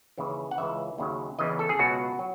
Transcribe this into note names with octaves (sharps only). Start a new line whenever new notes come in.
D#2 C#3 E3
F#5
C#2 C#3 E3 E5
D#2 C#3 F#3
E2 C#3 E3 D#5
A4
G#4
C#2 B2 F#3 F#4
F#3